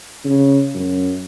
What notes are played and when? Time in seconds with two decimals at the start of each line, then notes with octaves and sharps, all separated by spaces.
0.25 C#3
0.74 F#2